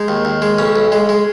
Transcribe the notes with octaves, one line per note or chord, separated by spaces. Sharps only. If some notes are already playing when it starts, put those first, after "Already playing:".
Already playing: G#3 D#4
D#2
D#2
G#3
B1 C#4
B1
G#3
G#3